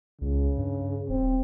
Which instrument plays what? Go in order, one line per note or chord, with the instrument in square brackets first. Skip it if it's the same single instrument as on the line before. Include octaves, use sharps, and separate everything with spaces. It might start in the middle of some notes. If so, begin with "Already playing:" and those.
[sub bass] C#2 [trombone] C#3
[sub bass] G2
[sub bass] D#1 [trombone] C4